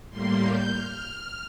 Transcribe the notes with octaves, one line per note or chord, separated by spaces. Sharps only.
A2 G3 A#3 C6
G6
F6